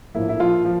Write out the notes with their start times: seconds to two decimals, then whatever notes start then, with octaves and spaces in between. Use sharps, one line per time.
0.15 A#1 A2 F3 A#3 E4
0.29 E4
0.40 F3 F4
0.65 F3